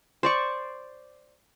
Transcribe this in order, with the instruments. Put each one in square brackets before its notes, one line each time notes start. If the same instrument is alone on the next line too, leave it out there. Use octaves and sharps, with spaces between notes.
[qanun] C5 D5 C#6